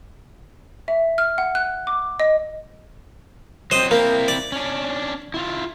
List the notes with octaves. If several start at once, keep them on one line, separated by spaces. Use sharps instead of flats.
E5
F6
F#5
F#6
D6
D#5
F#3 C4 C5 D#5
A#3 C4 E4
D5
C#4 D4
E4 F4